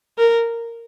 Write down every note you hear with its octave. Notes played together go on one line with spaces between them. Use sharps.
A#4